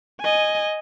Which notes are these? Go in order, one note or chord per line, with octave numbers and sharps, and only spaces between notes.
D#5 G#5